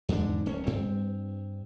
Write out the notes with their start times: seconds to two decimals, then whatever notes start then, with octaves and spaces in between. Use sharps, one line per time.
0.09 E2 G#2 D3 D4
0.46 D1 C#4
0.67 G2 C4